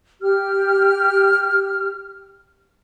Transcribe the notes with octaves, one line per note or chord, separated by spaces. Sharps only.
G4 F6